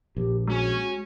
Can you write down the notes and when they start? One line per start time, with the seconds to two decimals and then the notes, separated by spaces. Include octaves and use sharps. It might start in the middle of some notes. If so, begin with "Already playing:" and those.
0.16 A#1 G4
0.47 G#3 C#4 F#4